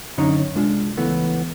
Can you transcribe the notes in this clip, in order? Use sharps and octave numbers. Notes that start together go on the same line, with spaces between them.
F#2 D3 C#4 D#4 C#5 A#5
C2 G#3 D4 F4
C#2 E3 A3 B3